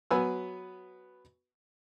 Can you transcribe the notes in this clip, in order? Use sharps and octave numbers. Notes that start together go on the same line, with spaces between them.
F#3 B3 B4 G#5 E6